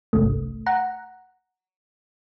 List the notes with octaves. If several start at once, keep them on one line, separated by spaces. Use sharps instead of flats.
G1 C2 A3
F#5 A#5